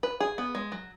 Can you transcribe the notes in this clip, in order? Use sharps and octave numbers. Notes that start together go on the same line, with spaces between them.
B4
G#4
B3
G#3
F#3